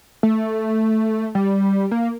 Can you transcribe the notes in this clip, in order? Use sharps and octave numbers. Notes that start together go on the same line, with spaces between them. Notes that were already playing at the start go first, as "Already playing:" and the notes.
A3
G3
A#3